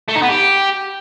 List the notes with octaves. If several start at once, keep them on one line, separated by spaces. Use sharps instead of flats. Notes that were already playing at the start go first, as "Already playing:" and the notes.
A3
D#4
B3
G4